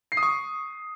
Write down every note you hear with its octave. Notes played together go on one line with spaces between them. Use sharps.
C7
D#6
C#6